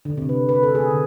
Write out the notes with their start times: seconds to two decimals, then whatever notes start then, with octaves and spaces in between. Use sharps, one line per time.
0.05 D3
0.17 C3
0.29 B4
0.49 B4
0.63 A4
0.75 G#4
0.91 D3